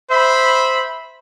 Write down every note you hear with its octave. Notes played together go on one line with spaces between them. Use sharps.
C5 E5 B5